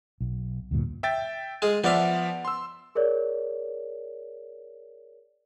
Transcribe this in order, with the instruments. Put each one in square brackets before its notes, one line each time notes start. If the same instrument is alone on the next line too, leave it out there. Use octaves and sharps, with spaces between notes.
[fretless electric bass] B1
D2 G2 A#2
[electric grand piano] E5 G5 A6
[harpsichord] G#3 F4 G#4
[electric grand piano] F3 D5 E5 [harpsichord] B3 F5
[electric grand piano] C6 E6
[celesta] G#4 A#4 C#5 D5